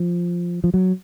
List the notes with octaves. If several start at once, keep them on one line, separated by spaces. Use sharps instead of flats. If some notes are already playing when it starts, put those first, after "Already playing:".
Already playing: F3
F3
F#3